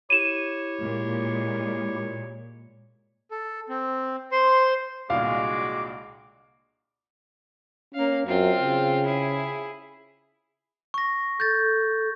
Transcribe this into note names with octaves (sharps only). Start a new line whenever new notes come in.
E4 G4 C#5 D#7 E7
A#2 G#3
A4
C4
C5 C6
C2 A#2 D3 G#3 F#4 F5 D6
A#3 C#4 F5
F#2 C4 F4
C#3
E4 G#4
C#6 A#6
A4 G6 A6